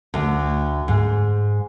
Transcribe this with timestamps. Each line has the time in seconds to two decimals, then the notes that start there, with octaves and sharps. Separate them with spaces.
0.14 D2
0.88 G#2